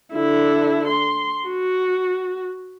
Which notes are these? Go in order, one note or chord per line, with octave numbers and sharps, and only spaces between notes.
D3 E4
C6
F#4